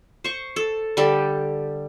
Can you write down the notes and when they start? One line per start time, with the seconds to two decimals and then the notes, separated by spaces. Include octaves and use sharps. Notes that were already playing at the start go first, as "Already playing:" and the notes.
0.24 C5 C#6
0.56 A4
0.97 D3 G3 G4 A4